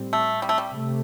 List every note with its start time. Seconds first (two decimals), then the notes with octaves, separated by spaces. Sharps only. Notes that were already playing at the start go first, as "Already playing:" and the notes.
Already playing: A2 G3 C4
0.13 A3
0.42 G3
0.49 A3
0.58 G3
0.71 C3 A3